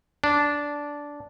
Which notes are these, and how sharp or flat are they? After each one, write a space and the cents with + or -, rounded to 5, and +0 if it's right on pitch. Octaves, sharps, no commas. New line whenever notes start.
D4 -10